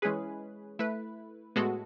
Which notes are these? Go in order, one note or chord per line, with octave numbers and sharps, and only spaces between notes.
E3 G#3 C#4 G#4 B4
A3 E4 B4
A2 G#3 B3 F#4 A4